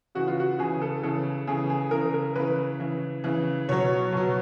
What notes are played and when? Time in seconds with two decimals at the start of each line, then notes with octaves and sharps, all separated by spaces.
0.15 C#3 E3 F#4
0.28 F4
0.40 F#4
0.59 C#3 E3 G#4
0.82 A4
1.03 C#3 E3 A4
1.47 C#3 E3 G#4
1.70 G#4
1.91 C#3 E3 A#4
2.14 A#4
2.35 C#3 E3 B4
2.80 C#3 E3
3.24 C#3 E3
3.68 B2 F#3 C#5
4.13 B2 F#3